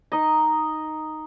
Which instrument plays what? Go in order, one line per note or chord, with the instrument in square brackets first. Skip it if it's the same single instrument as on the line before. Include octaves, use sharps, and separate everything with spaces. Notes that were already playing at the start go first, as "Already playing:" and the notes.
[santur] D#4 D#5